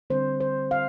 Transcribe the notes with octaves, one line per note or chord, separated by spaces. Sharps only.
D3 G3 C4 C5
C5
F5